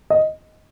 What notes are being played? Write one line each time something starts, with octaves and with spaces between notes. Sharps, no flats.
D#5